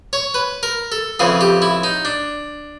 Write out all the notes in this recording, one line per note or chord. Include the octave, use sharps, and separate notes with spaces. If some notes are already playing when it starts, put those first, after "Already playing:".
C#5
B4
A#4
A4
F2 C#3 E3 G#4
G4
E4
D#4
D4